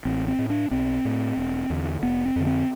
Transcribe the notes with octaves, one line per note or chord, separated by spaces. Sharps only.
A1 C4
C4
A2
D4
B1 C4
A2
E1
E2 D3
F1 B3
C4
F2 D3
C4